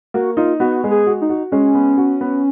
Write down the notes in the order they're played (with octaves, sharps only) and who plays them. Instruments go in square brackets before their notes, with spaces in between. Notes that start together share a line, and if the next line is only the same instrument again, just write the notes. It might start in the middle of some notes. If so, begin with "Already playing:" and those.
[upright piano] A#3 [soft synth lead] F#4
[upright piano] D#4 [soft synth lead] F4
[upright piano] B3 [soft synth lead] F#4
[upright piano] G#3
[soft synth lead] G#4
[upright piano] F#4
[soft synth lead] D#4
[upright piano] F#4
[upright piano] G#3 [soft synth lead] C#4
[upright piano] B3
F#4
B3